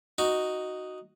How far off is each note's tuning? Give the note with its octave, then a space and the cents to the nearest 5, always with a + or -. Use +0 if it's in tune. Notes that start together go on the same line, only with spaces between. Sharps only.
D#4 +0 F#4 +0